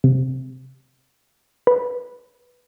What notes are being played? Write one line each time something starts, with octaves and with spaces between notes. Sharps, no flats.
C3
B4